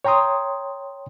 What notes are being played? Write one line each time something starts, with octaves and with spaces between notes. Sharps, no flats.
C#5 G5 A#5 C6 D#6